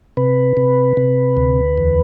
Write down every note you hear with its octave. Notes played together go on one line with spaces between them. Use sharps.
C3 B4
C3
C3
D2
E2